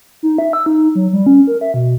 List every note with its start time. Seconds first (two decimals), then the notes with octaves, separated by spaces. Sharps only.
0.23 D#4
0.38 E5
0.53 E6
0.66 D#4
0.95 F#3
1.13 G3
1.26 C#4
1.47 A#4
1.61 E5
1.74 B2